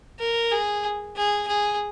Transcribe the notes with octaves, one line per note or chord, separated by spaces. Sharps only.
A#4
G#4
G#4
G#4